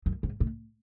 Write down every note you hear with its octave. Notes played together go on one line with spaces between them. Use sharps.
F#2
G#2
A2